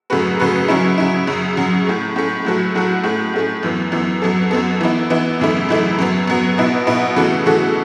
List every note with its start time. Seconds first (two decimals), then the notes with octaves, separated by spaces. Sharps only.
0.10 F#2 C#3 A3 F#4 B4
0.40 F#2 C#3 A3 F#4 B4
0.68 C#3 F#3 C#4 E4
0.98 C#3 F#3 C#4 E4
1.27 F#2 C#3 F#3
1.57 F#2 C#3 F#3
1.86 A2 A3 C#4
2.16 A2 A3 C#4
2.45 A2 F#3 A3 F#4 A4
2.75 A2 F#3 A3 F#4 A4
3.04 A2 A3 C#4
3.34 A2 A3 C#4
3.63 F#2 E3 B3
3.92 F#2 E3 B3
4.22 F#2 F#3 B3 A4
4.51 F#2 F#3 B3 A4
4.81 E3 B3 E4
5.10 E3 B3 E4
5.40 F#2 C#3 E3 A3 E4
5.69 F#2 C#3 E3 A3 E4
5.99 F#2 F#3 B3
6.28 F#2 F#3 B3
6.58 B2 B3 E4 B4
6.87 B2 B3 E4 B4
7.16 C#3 E3 A3 F#4 A4
7.46 C#3 E3 A3 F#4 A4